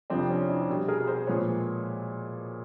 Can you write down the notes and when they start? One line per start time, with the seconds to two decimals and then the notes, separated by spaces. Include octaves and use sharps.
0.10 F2 C3 F3 C4 D4
0.30 C#4
0.49 D4 E4
0.69 B2 G3
0.88 G#4 A#4
1.07 A#4 C5
1.27 A#2 F3 G#3 B4 C#5